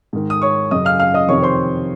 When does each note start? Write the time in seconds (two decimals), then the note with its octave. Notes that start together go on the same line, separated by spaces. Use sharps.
0.13 G#2 D#3
0.30 D#6
0.42 C#5 C#6
0.71 F#2 C#3 D#5 D#6
0.85 F5 F6
0.99 F5 F6
1.14 D#5 D#6
1.28 F2 C3 D#3 C#5 C#6
1.42 C5 C6